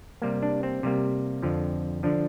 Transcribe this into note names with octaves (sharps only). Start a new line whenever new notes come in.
C3 G3 A#3
D4
C4
C3 G3 A#3
F2 D3 F3
D3 F3 D4